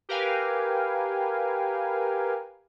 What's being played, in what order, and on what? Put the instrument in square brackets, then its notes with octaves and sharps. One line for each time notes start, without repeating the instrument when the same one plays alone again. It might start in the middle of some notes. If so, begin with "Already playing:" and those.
[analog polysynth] G4 A#4 B4 F5 G5 G#5